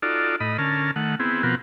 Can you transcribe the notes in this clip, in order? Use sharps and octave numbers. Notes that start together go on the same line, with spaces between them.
D#4 F4 F#4 A4 D5
A2 D#5 B5
D3 C#4 A#4 A5 F6
D#3 A3 F#5
B3 C4 E4 G#4
B2 F3 B3 C4 F#4 A#4